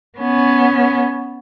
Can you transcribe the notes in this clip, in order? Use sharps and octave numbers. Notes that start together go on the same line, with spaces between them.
B3 C#4